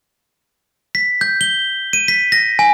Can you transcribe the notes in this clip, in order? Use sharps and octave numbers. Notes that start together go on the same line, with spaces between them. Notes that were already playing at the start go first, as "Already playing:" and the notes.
B6
G6
G7
D#7
B6
A#6
G#5